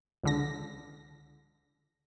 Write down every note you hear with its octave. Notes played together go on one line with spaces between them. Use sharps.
C#2 D3 A#6